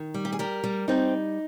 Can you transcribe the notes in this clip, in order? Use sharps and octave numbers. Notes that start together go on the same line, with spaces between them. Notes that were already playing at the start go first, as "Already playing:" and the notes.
Already playing: D#3
G3
G4
G#4
G3 G4 A#4
G3
G3 C4 D#4